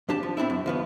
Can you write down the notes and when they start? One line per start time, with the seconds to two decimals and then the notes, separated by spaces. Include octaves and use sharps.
0.09 F2 D4 G4 A5
0.23 F3
0.37 A2 C4 D4 E4
0.50 F#2
0.66 D#2 F3 B3